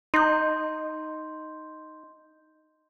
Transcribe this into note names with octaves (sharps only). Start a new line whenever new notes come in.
D#4 C6 G6